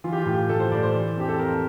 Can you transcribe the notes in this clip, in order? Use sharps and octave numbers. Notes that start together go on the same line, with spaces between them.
E3 F4
G4
F4
A2
G4
A2 A4
C5
A2 D5
C5
E3
F2 G4
A4
F2 A#4